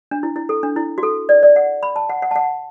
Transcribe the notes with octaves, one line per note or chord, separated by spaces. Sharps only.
D4
E4
E4
A4
D4
E4
F#4
A4
D5
D5
F#5
B5
A5
F#5
F#5
A5
F#5